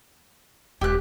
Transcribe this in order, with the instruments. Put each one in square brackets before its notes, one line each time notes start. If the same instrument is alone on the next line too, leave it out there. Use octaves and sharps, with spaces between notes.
[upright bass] E1 [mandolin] G4 F#6